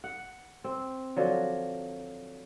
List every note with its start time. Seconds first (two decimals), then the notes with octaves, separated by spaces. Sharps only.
0.04 F#5
0.64 C4
1.16 D3 F3 F#3